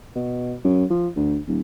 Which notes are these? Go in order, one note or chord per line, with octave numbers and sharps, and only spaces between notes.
B2
F#2
F3
D2
D#1